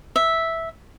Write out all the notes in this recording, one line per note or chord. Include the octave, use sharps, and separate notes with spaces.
E5